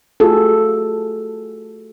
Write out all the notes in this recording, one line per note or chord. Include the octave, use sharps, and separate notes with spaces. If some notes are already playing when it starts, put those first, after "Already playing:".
A3 F4 F#4 G#4 A4